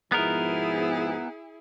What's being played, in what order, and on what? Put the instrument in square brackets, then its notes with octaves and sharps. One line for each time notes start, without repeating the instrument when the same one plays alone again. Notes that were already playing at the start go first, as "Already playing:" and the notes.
[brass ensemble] G#2 B2 F3 [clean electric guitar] B3 D#4 A#4 [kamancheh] E4 G#4